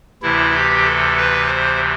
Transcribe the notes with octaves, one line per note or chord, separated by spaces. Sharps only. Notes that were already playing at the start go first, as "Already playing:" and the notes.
D2 C3 E3 E4
G4
A4
B4
C5